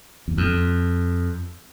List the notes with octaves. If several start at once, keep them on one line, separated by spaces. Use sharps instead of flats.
E2
F2